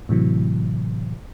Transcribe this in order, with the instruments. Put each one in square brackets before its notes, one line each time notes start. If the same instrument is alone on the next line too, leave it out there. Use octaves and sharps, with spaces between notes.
[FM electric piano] A2 C3 E3 F#3